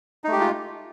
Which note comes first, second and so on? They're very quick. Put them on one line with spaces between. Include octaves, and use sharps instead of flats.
D#4 A3 G4 G#3 F4